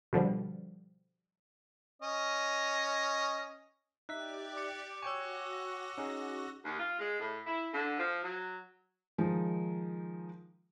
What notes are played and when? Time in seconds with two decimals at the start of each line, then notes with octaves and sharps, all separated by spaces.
0.13 B2 D3 F3 G3
2.02 C#4 D#5
4.09 D#4 G4 D5 E5 F#6 B6
4.57 D6 C#7
5.02 F#4 C#5 G5 G#5 C#6 E6 A#6
5.98 C#4 D#4 G#4
6.65 D#2
6.79 F4
6.99 G#3
7.20 A2
7.46 E4
7.74 D3
7.98 F3
8.23 F#3
9.18 D#3 F3 G#3 D#4